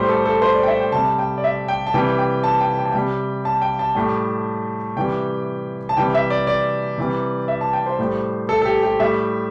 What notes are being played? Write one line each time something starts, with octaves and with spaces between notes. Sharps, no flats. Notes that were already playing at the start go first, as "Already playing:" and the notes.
Already playing: A2 G3 C5
A4
A4
C5
D5
G5
E5
G5
C3 G3 A5
G5
D5
E5
G5
A5
C3 E3 G3 G5
G5
A5
G5
G5
A5
C3 G3 G5
A5
G5
A5
A2 G3
C3 E3 G3 G5
A5
C3 E3 G3 G5
E5
D5
D5
C3 E3 G3
E5
A5
G5
C5
A2 G3
A4
A4
G4
G4
A2 G3 E5